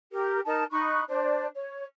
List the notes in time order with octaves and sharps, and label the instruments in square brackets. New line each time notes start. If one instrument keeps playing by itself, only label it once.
[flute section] G4 A#4
D#4 A#4 A5
D#4 B5 C#6 F#6
D4 C5 D5
C#5